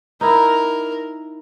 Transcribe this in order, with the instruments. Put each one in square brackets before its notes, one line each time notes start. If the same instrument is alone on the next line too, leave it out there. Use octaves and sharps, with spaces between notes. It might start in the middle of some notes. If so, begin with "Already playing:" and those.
[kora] D#4 E4 [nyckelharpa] A#4